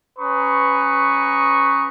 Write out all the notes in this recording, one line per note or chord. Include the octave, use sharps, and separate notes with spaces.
C#4 B4 A#5 C6 C#6 D#6